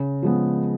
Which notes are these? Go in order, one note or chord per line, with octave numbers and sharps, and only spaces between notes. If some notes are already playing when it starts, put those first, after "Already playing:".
Already playing: C#3
F3 G#3 B3